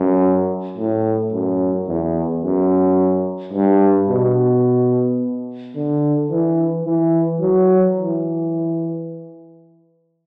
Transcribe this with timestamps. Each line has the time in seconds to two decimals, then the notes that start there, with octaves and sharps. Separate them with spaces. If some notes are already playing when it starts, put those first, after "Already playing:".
Already playing: F#2
0.77 A2
1.33 F#2
1.88 E2
2.44 F#2
3.53 G2
4.09 B2
5.75 D3
6.30 E3
6.86 E3
7.41 F#3
7.97 E3